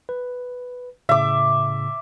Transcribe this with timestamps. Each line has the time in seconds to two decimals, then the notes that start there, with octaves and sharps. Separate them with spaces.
0.09 B4
1.09 A2 C#3 E5 D6